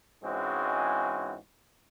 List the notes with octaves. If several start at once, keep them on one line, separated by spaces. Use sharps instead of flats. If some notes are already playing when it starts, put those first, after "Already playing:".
G#2 E3 G#3 C4 C#4 F#4